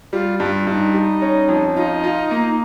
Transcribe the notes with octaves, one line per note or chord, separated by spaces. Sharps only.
G3 F4
G2 F4
G2 D#4 F4
G3
C#4
F2
D#4 F4
F4
A#3